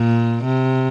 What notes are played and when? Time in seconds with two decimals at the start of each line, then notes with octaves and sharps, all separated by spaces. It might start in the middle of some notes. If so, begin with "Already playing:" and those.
Already playing: A#2
0.43 C3